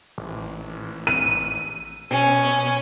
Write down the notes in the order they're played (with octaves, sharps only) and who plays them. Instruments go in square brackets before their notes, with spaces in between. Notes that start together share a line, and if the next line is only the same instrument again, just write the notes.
[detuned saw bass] A1
[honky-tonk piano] D#7
[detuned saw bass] B2 [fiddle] C#4